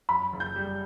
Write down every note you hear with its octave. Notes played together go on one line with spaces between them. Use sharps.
F#2 B5
F#1
G6
G3